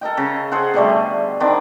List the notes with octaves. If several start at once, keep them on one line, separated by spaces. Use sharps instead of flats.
A4 A#4 D#5 G5
C#3 A#5
G#4 A4 C5 F#5
B2 D3 G3 A3
G#5
D#3 B3 C4 D4